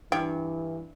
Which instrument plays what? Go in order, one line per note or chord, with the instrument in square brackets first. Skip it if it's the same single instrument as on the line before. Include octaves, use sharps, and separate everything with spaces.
[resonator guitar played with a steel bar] G2 [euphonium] E3 [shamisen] G5